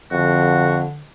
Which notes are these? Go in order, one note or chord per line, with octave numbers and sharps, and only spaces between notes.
F2 D3 F#4